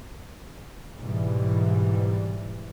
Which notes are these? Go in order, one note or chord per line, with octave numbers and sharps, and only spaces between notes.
G#2 B2 E3 G3